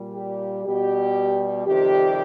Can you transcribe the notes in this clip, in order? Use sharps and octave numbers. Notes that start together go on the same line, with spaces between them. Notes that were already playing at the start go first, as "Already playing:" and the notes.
Already playing: A#2 G3
G4
B2 G3 G4
F2 C3 D#3 G3 G4